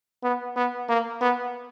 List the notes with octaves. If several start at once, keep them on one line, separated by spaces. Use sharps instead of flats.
B3
B3
A#3
B3